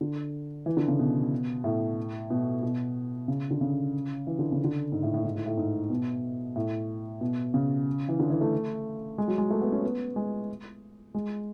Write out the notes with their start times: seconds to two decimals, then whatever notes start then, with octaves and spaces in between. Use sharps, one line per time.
0.01 D3
0.66 E3
0.77 D3
0.88 C#3
0.99 B2
1.64 A2
2.30 B2
2.63 B2
3.28 C#3
3.51 D3
3.61 C#3
4.27 E3
4.39 D3
4.52 C#3
4.64 D3
4.92 G#2
5.03 A2
5.14 A2
5.24 G#2
5.35 A2
5.46 A2
5.57 G#2
5.90 B2
6.56 A2
7.21 B2
7.54 C#3
8.09 E3
8.19 D3
8.30 E3
8.41 A3
9.18 G#3
9.28 F#3
9.38 G#3
9.51 A3
9.61 B3
9.72 C#4
9.83 B3
10.16 G#3
11.14 G#3